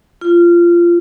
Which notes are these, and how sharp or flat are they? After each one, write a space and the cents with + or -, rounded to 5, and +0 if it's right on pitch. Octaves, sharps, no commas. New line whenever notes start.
F4 -20